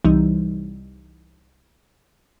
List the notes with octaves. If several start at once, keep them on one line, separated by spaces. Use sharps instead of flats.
C2 C3 E3 G3 D#4